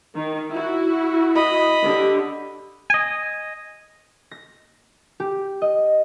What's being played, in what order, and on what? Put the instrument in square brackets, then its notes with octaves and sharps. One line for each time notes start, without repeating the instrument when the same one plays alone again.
[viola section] D#3
E4 F#4
[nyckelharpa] D#5 B5
[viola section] D3 G4
[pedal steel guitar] D#5 G#5
[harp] A#6
G4
D#5